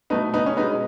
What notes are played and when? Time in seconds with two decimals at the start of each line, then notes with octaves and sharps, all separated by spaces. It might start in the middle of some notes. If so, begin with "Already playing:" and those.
0.10 B2 A3 B3 D#4
0.34 B3 D#4
0.46 C#4
0.57 B2 G#3 B3 D#4